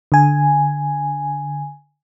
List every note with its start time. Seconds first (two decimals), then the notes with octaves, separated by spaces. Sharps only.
0.12 D3 G#5